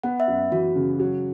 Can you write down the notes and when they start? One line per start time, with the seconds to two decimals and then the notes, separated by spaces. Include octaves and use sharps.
0.04 B3 F#5
0.20 E5
0.28 F#2
0.52 E3 F#4
0.76 C#3
1.00 F#3